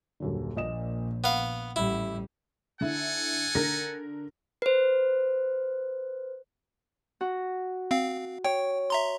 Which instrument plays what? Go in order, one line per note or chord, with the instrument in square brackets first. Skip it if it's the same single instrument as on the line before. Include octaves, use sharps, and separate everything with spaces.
[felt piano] D#1 F#2 D3
[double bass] A#1 [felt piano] A#2 D#5 E7
[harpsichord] B3 F5 [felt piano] F#5
[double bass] A1 G3 [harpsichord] E4
[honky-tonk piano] D3 E4 [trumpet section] A4 F#5 G#5
[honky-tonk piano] D3 A#4 A#6
[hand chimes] B4 C5
[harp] F#4
[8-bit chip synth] C4 F5
[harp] C#5 [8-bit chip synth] G5
[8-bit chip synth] E5 A#5 C6